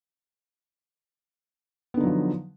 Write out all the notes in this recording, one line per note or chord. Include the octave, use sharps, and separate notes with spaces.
D3 F3 F#3 B3 D#4